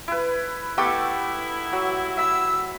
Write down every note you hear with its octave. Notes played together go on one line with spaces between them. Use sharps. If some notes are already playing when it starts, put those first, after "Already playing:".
E4 B4
A3 B3 E4 G4 A5 C#6 D6
F#3
E5 B5 E6